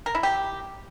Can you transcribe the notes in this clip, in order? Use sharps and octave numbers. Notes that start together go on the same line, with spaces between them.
A#4
E4
G4